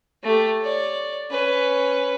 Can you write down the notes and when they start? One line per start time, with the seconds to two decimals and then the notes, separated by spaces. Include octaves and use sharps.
0.23 A3 G4
0.62 C#5 D5
1.31 C#4 B4